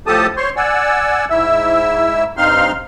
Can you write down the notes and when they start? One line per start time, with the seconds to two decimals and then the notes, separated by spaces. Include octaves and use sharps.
0.07 A2 F3 G4 A4 A5 D#6
0.37 C5 C#5 C6 C#6
0.57 D5 F#5 G#5 E6
1.30 G#2 E4 E5 E6
2.37 G2 C4 D#4 F5 C6 F6